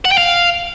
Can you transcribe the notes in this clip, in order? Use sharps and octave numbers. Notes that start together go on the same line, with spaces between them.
F#5
G5
F5